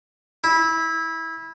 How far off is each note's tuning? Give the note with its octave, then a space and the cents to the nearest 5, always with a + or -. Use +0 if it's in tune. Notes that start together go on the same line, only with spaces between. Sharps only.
E4 -20